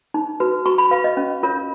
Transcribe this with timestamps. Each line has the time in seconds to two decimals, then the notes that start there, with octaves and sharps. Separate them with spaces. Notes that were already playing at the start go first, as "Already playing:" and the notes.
0.14 D#4
0.40 F#4 B4
0.66 F#4 C#6
0.78 B5
0.91 B4 F5
1.04 D#5
1.17 C#4
1.43 F4 A#4 C#5